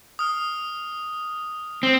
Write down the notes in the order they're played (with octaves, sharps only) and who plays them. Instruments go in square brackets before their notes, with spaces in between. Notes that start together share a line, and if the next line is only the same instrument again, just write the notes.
[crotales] D#6 F6
[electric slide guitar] C4